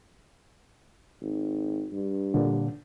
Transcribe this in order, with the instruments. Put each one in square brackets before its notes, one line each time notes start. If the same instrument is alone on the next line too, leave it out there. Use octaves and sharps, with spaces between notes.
[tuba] G#1
G2
[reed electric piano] A#2 D3